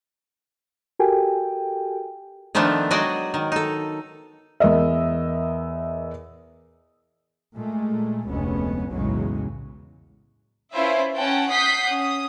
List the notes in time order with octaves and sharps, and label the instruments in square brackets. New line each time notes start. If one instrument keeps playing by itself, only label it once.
[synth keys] F#4 G4 A4 A#4 G5 G#5
[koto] D#3 F3 A3 B3 D4
F#3 G#3 F#4 D5 D#5 G5
D#3
D#4 A4
[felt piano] E2 A#4 D#5 E5
[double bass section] A#2 G#3 A3
F1 D2 G#3 B3 C#4
B1 E2 A2 C#3 F#3 G#3
[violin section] C#4 E4 F4 B4 C5 E5
C#4 F#5 G5 A5
F#5 D#6 G6 B6 C7
C#4 D#6